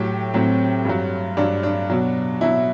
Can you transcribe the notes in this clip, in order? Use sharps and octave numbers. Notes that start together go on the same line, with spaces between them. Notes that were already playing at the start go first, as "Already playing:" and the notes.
Already playing: A2 F#3 G4
A2 F#3 C4
G2 F#3
G2 F#3 D4
D4
B2 F#3
B2 F#3 E4